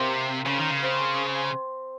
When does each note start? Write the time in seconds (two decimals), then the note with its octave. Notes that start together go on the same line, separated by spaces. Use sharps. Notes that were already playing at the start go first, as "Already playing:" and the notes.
Already playing: C3 A#3 C4
0.46 C#3 C#4
0.59 D#3
0.71 C#3
0.83 C4